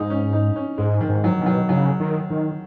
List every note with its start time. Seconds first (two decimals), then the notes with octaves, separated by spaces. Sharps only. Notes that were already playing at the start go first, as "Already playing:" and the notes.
Already playing: G#2 D#4
0.10 C#4
0.33 D#4
0.56 C#4
0.78 G#2 G#3
1.01 D#3
1.09 G#2
1.24 F#3
1.39 B2 D#3
1.46 F#3
1.69 C#3 F#3
2.00 D#3
2.30 D#3